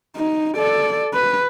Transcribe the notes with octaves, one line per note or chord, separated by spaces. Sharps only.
D#4
A4 D5
B4